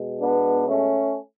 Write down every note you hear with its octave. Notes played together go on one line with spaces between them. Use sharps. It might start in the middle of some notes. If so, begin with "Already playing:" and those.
Already playing: B2 G#3
B3 D4
A3 C#4